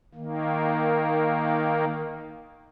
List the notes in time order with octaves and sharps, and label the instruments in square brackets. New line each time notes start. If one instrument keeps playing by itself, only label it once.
[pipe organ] D#3 A#3